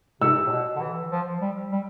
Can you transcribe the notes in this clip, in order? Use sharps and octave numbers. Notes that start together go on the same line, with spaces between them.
C3 E6
A2
B2
D3
E3
F3
G3
G3